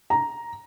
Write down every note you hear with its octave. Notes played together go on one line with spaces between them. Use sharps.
A#5